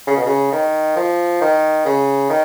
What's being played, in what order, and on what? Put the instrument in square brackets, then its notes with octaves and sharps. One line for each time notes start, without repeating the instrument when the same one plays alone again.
[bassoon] C#3
B2
C#3
D#3
F3
D#3
C#3
D#3